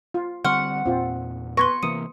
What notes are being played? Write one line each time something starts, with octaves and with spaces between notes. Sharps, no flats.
F4
D3 G3 C4 F#5 C6 C#6 F6
E2 A#2 C4 F4
B3 B4 C6 C#6 G#6 A#6
C3 E3 A#3 D#6 C#7 D#7